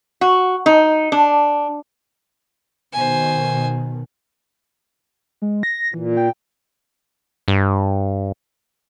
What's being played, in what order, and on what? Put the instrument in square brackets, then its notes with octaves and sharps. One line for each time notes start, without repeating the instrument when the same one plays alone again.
[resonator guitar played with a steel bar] F#4
D#4
D4
[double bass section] B2 D#3 [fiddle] C5 G#5
[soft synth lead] G#3
A#6
[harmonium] A#2 [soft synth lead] E3
[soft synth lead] G5
[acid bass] G2